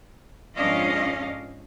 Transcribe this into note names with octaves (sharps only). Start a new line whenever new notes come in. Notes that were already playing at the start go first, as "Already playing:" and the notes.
F2 G#2 C#4 D4 D#5 F5